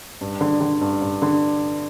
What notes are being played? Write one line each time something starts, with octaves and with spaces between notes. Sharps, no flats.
G2
D3
D3
G2
G2
D3